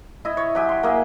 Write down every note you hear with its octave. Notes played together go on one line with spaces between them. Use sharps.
E4 D#5 E5
C#5
F#3 G4 G#5
C6
A#3 G#4 E5